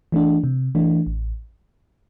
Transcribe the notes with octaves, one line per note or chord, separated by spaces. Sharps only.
E3 A3 D4
C3
E3 A3 D4
A1